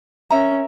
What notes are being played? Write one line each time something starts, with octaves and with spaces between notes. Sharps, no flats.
C#4 A#4 E5 A#5